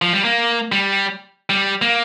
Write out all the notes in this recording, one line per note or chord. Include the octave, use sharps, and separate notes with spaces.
F3
G3
A#3
G3
G3
A#3